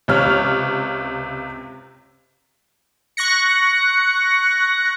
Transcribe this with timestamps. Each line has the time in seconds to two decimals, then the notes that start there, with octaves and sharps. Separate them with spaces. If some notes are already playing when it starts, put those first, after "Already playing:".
0.08 C#2 C3 C#5 F6
3.17 C#6 F#6 A#6 C#7